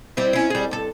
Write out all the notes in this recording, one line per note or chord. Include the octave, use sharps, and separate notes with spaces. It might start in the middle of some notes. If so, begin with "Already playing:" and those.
G3 C4 E4
C#4 E4
G3 G#4
G2 A4